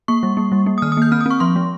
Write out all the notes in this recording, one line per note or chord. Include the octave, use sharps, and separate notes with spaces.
A#3 C#6
G3
A#3
G3
A#3
D#6
D#3 F6
D#6
A#3 G6
C4 F6
D#6
C4 C#6
F3 C6
G#3